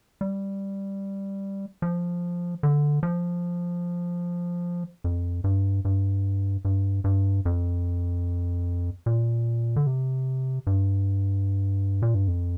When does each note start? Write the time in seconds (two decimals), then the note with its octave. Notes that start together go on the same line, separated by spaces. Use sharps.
0.21 G3
1.82 F3
2.63 D3
3.03 F3
5.04 F2
5.44 G2
5.85 G2
6.65 G2
7.04 G2
7.45 F2
9.06 A#2
9.76 D3
9.87 C3
10.67 G2
12.02 A#2
12.14 G2
12.28 F2